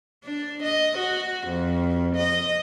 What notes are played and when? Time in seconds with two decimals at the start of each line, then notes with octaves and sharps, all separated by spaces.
0.25 D4
0.63 D#5
0.98 F#4
1.48 F2
2.16 D#5